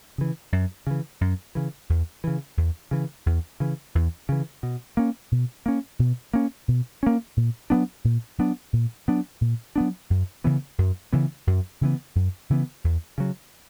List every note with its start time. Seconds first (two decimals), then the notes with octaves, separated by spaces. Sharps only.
0.18 C#3 E3
0.52 F#2
0.87 C#3 E3
1.21 F#2
1.55 C#3 E3
1.90 E2
2.24 C#3 E3
2.57 E2
2.91 C#3 E3
3.26 E2
3.60 C#3 E3
3.95 E2
4.29 C#3 E3
4.63 B2
4.97 A#3 C#4
5.32 B2
5.66 A#3 C#4
5.99 B2
6.34 A#3 C#4
6.68 B2
7.03 A#3 C#4
7.37 A#2
7.70 F#3 B3 D4
8.05 A#2
8.38 F#3 B3 D4
8.73 A#2
9.08 F#3 B3 D4
9.41 A#2
9.76 F#3 B3 D4
10.10 F#2
10.44 C#3 E3 B3
10.78 F#2
11.13 C#3 E3 B3
11.47 F#2
11.81 C#3 E3 B3
12.15 F#2
12.50 C#3 E3 B3
12.84 E2
13.18 C#3 F#3